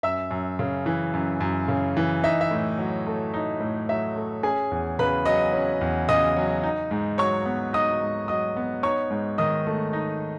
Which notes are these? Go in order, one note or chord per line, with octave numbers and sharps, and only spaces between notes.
F#2 E5 E6
F#2
C#3
E3
F#2
F#2
C#3
E3
D#4 E5
E5
A2
F#3
A3
D#4
A2
F#3 E5
A3
C#4 G#4 G#5
E2
C#3 B4 B5
F#3 D#5 D#6
C#4
E2
C#3 D#5 D#6
F#3
D#4
G#2
F#3 C#5 C#6
B3
D#4 D#5 D#6
G#2
F#3 D#5 D#6
B3
D#4 C#5 C#6
G#2
D#3 D#5 D#6
A3
D#4